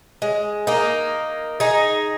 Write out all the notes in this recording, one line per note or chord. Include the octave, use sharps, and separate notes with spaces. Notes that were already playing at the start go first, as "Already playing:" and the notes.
G#3
A#3 D#4
D#4 G#4